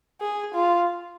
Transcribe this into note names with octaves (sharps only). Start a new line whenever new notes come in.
G#4
F4